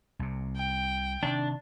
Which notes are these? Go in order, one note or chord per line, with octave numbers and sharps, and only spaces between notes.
C2 C3
G5
C3 D#3 D4